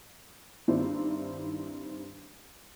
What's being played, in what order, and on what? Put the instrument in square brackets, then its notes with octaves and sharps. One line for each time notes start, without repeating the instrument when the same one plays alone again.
[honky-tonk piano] G2 D#3 C4 D4 E4